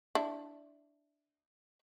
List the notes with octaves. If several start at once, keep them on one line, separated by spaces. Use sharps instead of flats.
D4 E4